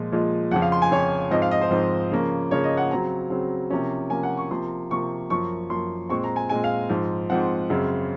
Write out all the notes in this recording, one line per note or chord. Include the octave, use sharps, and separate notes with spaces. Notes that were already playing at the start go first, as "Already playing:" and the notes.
Already playing: A#2 F3 G#3
A#2 F3 G#3
F2 C#3 F3 F#5
F5
C6
G#5
F2 C#3 F3 C#5
G#2 F3 C4 D#5
F5
D#5
C5
G#2 F3 C4
C#3 F3 A#3 C#4
C#3 F3 A#3 C#4 C#5
D#5
F#5
C#3 F#3 C4 A#5
C#3 F#3 C4
C3 F3 A#3 C#4
C3 F3 A#3 C#4 G#5
F#5
C#6
C3 F3 A#3 C6
C3 F3 A#3 C#6
F#2 F3 A#3 C#6
F#2 F3 A#3 C6
A#2 G#3 C4 C#6
A#5
G#5
A#2 G#3 C4 G#5
F5
G#2 F3 C4
G#2 F3 C4 F#5
F#2 C#3 G#3 C4